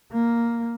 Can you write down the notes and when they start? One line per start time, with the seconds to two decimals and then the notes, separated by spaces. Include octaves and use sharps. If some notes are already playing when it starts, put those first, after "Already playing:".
0.12 A#3